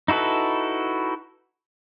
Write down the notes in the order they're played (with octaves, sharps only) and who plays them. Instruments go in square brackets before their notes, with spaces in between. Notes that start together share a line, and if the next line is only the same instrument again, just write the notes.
[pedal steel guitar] D#4 E4 F#4 A4 B4